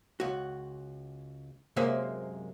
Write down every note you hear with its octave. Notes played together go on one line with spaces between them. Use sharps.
C#2 F#4
F#2 C3 G#3 A#3 C5 E5